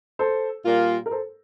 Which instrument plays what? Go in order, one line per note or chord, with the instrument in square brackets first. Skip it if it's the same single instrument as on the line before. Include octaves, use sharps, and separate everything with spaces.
[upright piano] A4 C5
[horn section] A#2 G3 A#3 F4
[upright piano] A#4
A4 C5